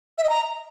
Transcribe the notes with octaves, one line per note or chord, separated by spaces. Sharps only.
E5
D#5
A#5